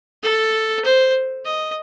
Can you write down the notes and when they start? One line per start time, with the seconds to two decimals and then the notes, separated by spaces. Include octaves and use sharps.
0.23 A4
0.84 C5
1.45 D#5